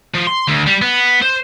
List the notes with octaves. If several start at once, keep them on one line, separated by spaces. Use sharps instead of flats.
F3
C6
D2
G3
B3
C5